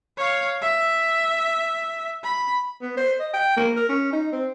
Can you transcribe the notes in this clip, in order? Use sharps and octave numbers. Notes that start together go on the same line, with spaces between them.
C#5 F5
E5
B5
B3
C5
D#5
G5
A#3
A#4
C#4
D#4
C4